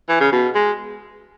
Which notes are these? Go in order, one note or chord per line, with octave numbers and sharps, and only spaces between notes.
E3
C#3
B2
G#3